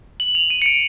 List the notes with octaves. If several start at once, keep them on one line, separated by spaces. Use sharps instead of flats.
F#7
F7
D#7
C#7
D7